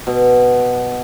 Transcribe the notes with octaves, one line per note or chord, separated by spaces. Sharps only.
B2